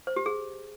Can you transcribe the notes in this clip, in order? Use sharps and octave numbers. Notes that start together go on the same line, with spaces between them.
C5
G4
G#4